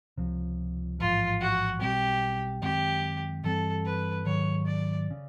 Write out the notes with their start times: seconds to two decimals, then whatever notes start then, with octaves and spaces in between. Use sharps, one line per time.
0.17 C#2 C3 F3
0.99 A1 G#2 F3 F4
1.41 F#4
1.81 B1 B2 G3 C4 G4
2.62 F#2 D#3 G#3 C4 G4
3.43 G2 E3 G3 C4 A4
3.85 B4
4.25 G#2 D#3 F#3 C#5
4.66 D5
5.11 C#3